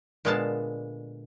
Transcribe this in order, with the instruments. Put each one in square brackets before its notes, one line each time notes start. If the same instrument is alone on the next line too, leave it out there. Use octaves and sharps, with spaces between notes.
[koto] A#2 D3 G#3 B3 F5 A5